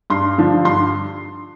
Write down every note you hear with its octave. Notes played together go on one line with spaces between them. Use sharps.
G2 C6
D3 F3
G2 C6